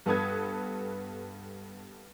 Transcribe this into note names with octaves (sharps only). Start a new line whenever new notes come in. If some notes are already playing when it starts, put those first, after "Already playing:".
G2 B3 A4 B4 D#6 G#6